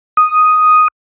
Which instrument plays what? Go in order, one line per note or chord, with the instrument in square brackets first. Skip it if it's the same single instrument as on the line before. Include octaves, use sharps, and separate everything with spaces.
[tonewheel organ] D#6